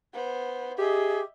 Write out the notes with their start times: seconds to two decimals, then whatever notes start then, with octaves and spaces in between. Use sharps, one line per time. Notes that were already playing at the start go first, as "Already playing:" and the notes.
0.13 B3 C5
0.78 G4 G#4 D#5 E5